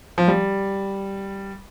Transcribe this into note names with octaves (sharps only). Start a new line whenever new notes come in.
F3
G3